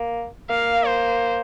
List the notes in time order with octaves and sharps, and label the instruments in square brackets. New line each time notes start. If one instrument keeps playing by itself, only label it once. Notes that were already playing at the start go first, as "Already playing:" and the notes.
Already playing: [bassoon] A#3
[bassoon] A#3 [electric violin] F5
[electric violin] C5